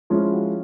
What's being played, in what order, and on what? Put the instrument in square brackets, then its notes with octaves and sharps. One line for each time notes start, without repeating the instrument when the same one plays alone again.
[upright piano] F3 G#3 C#4 E4 F4
F#4